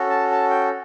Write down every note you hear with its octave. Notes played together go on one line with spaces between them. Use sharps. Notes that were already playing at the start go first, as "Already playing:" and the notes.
Already playing: C#4 F#4 A4
A5
A5
G5